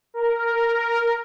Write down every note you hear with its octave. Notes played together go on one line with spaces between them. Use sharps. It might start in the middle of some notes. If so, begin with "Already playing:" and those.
A#4